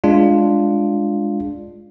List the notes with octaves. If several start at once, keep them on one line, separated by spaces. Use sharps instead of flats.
G#3 D4 F4